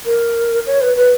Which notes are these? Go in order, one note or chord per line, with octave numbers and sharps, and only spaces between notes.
A#4
C#5
B4
B4